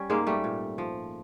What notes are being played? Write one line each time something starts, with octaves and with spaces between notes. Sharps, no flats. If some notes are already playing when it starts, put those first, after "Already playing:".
Already playing: G3 C#4
G#2 G#3 A#3
G3 A3
A#2
F3